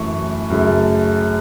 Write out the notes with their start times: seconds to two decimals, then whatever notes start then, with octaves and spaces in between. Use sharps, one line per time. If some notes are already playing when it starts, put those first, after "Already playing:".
Already playing: F#2 E3 A3 C#6
0.50 F#2 C#3 A3